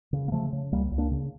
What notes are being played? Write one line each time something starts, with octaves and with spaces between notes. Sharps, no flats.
C#3
A#3
C#3 F3 A3
C#3
C#2 G3 A#3
C#2
A#3 D4
C#3